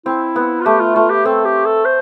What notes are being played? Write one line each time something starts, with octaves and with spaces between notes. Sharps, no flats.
C4 E4
B3
F4
A3 G4
F4
A3 F4
G4
C4 A4
G4
A4
C5